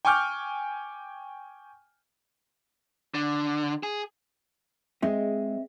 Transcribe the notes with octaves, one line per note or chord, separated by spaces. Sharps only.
G5 G#5 C#6 D6 F6 G6
D3
G#4
G#3 C4 D#5 E5